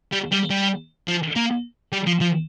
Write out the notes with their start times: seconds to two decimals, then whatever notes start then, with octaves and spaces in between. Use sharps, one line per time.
0.12 G3
0.32 G3
0.50 G3
1.07 F3
1.36 A#3
1.92 G3
2.07 F3
2.21 F3